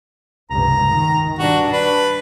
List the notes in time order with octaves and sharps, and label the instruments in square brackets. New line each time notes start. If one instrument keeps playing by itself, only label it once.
[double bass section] F1 C#2 G2 [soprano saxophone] A#5
[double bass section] D#3
[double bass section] G2 [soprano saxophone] D4 [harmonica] F#4
[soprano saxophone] D4 [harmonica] B4